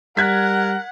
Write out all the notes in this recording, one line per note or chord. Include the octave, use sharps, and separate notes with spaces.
G3 A#4 F#5 F#6 G#6 B6